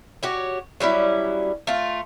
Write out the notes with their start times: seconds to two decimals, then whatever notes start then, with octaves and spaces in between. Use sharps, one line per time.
0.23 F#4 G4 C#5
0.80 F#3 G3 C#4 E4
1.67 A3 F4